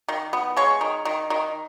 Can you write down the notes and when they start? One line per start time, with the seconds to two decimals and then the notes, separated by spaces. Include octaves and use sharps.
0.08 D#3
0.33 B3
0.57 G#3 C#5
0.81 D#3
1.05 D#3
1.30 D#3